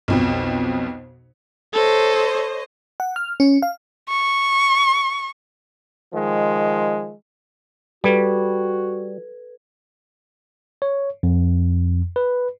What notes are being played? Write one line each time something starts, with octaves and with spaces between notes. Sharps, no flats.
B1 F2 B2
A4 C5 C#5 D#5
F#5
F6
C#4
F5
C#6
D#3 F3 G#3
G3 F#4 A4 B4 G#6
C#5
F2
B4